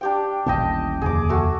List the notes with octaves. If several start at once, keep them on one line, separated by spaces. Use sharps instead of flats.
D4 G4 G5
D#1 A1 C#4 D#5 G5 A5
F1 D#2 D3 G#4 D6
A3 F#4